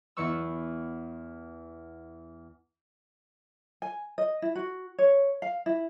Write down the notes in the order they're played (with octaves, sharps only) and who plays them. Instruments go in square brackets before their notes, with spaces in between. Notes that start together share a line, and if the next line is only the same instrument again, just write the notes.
[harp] E2 E3 B3 C#6 E6
[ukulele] G#5
D#5
E4
F#4
C#5
F5
E4